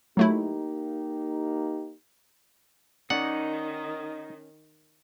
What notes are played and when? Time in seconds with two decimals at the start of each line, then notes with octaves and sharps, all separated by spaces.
0.17 F#3 A3 A#3 D#4 E4 G4
3.10 D#3 C#4 D#4 D5 F#5